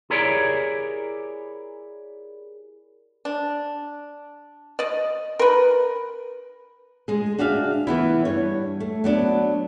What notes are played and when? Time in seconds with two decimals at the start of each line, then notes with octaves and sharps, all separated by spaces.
0.10 E4 G4 G#4 A#4 C#5 D5
3.25 D4
4.79 D5 D#5
5.39 A#4 B4
7.08 G#3 G#4
7.38 D4 F#4 G#4 E5 F5
7.87 E3 B3 E4
8.25 G2 C#5
8.80 A3
9.04 F#3 B3 D4